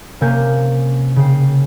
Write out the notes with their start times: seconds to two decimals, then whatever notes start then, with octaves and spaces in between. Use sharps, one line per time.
0.21 C3 A#3 C#4 F5 G#5 G6
1.16 C#3 C#5 G5 C7